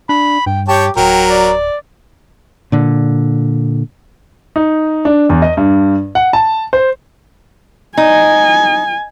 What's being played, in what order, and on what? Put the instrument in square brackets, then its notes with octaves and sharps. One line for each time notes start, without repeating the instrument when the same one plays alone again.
[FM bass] D4 [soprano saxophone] B5
[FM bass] G2 [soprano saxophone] G5
[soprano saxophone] G4 [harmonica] C#5 G5 A5
[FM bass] D1 [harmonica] F#3 A#4 [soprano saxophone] G5
[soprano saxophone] D5
[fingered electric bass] A#2 D3
[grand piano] D#4
D4
E2
D#5
G2
F#5
A5
C5
[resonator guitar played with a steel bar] D#4 [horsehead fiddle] G#5